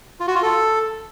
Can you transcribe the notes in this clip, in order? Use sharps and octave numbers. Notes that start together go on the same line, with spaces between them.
F4
F#4
F4
A4